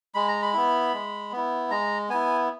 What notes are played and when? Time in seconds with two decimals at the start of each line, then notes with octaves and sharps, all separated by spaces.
0.14 G#3 B5
0.28 A#5
0.42 B5
0.54 B3 E4
0.93 G#3
1.32 B3 E4
1.70 G#3 A#5
2.09 B3 E4 G#5